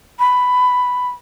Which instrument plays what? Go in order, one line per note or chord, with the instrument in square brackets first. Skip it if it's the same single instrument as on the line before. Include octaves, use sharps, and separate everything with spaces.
[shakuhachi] B5